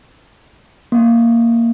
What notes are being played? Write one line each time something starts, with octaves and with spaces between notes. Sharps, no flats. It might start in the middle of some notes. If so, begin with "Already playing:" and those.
A#3